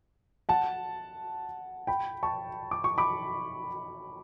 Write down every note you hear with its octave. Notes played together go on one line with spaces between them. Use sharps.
F#5 A5
G5 B5
A5 C#6
D6
C#6
B5 D6